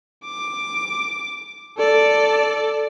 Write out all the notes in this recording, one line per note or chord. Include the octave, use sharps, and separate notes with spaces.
D6
A4 D5